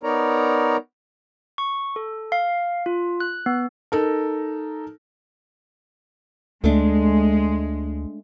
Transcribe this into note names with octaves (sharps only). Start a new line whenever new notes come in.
B3 D#4 A#4 C#5 D5 A#5
C#6
A4
F5
F4
F#6
B3
D#4 A4 A#4
D2 G#3 A3 D4